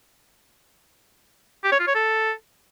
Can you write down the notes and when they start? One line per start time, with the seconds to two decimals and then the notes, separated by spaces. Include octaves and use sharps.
1.64 G4
1.71 C#5
1.79 F4
1.87 C#5
1.95 A4